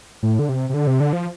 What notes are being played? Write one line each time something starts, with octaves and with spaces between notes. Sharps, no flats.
A2
D3
C3
C3
D3
C3
D3
F3